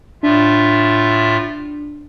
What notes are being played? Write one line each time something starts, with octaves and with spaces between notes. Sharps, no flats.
A2 D4 F4 E5